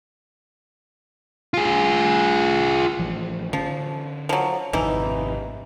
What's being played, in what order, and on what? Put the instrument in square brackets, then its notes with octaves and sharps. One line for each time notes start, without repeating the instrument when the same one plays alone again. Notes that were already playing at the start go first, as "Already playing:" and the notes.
[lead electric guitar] F4 G#4
[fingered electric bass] A1 F3
[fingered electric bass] D3 C#4 [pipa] F3
[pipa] F3 F#3
[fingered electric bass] G#1 F2 C3 [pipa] E3 D#4